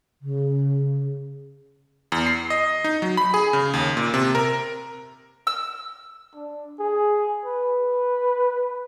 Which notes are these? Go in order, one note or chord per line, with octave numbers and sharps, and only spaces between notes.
C#3
E2
C7
D#5
D#4
F#3
B5
G#4
C#3
D#2
A#2
C3
A#4
E6
D4
G#4
B4